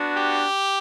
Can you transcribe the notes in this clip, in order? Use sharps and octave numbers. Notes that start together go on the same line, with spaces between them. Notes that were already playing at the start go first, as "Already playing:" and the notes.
Already playing: B3 D4 F#4
G4